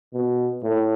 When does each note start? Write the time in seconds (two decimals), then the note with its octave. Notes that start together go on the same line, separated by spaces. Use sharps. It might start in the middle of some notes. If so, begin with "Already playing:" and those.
0.13 B2
0.63 A2